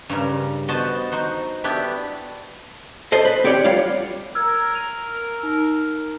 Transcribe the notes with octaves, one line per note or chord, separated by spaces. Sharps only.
G2 C#3 A#4
B3 F#4 C5 D#5 A5
D#4 F#4 C5
B3 D4 E4 F#4 G4
A4 C5 D#5
B4
C4 G4 C#5 D5 E5 G5
G3 F4 C#5 D5 F5 F#5
A#4 E6 F6 G#6
D#7 F7
D#4 E6